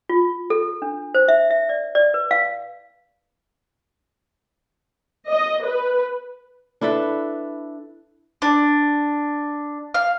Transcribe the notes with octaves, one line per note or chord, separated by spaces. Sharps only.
F4
A4
D4
C5
E5
E5
D5
D5
B4
F5
D#5
B4
D4 E4 A4 B4
D4
F5